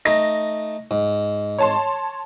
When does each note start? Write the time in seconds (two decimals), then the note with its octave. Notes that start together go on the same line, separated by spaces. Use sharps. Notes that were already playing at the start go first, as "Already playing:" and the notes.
0.05 A3 D#4 A#6
0.91 G#2
1.58 C#5 A5 C6